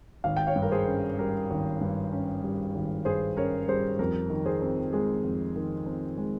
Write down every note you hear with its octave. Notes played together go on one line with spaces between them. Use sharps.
G#1 F5
G5
C#5 F5
G2
A#4
G#4 C5
C#4
G3 A#4
G#1
G2
C#4
G3
G#1
G2 G#4 C5
C#4 A#4 C#5
G3 G#4 C5
F2 A#4
D#3
G#4 C5
C4
G#3 G#4
F2
D#3
C4
G#3